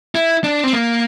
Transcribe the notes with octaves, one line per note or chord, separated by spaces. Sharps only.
E4
D4
C4
A#3